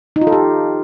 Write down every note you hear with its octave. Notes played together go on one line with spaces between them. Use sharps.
D#4
F4
A4
G4